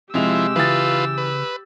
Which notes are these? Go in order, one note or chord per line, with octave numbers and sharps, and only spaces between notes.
C3 F3 G#3 E4 G4 E6 F7
C#3 E3 F4 B4 D#6 A6
B4